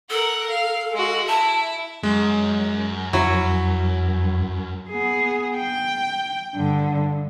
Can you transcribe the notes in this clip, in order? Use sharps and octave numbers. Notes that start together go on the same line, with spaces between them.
A4 A#4 F#5
F5
G#3 F#4
E4 E5 A5
F#2 G#3
F2 F#3 E4
B3 G#4
G5
G2 D3